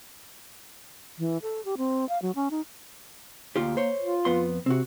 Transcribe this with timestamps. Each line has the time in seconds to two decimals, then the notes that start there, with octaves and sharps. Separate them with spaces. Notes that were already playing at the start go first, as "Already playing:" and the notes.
1.19 E3
1.42 A4
1.65 G4
1.78 C4
2.09 F5
2.22 F#3
2.35 C#4
2.51 D#4
3.56 D2 A#3 F4 G4
3.77 C5 C#5
4.02 F4
4.25 F2 B3 C6
4.66 C3 C4 F#4